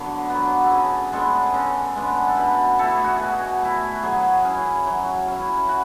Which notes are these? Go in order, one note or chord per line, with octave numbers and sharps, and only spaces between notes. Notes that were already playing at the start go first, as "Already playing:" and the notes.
Already playing: D3 F#3 B3
F#3 B3
A4
C#3 G#4
G#3 B3 D4 A4
G#4
C#3 A4
G#3 B3 D4
A4
B2 B4
A3 E4 A4
G#4
F#4
B2 G#4
A3 E4
F#4
F#3 G#4
C#4 E4
F#3
C#4 E4
F#4